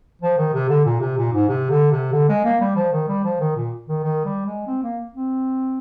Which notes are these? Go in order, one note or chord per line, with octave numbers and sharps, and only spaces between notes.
F3
D#3
C3
D3
A#2
C3
A#2
G#2
C3
D3
C3
D3
G#3
A#3
G3
F3
D#3
G3
F3
D#3
A#2
D#3
D#3
G3
G#3
C4
A#3
C4